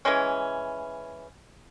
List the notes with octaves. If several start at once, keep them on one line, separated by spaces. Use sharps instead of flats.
E3 G#3 C#4